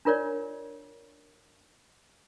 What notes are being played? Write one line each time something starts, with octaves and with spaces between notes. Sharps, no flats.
D4 F4 A#4 C#5 D5